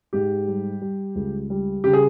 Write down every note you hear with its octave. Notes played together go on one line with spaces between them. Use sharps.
G#2 G4
G3
G3
C#2
G3
C#3 G4
G#4